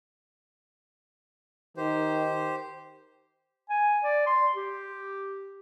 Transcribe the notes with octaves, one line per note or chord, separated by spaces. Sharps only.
D#3 G4 C5
G#5
D5
C6
G4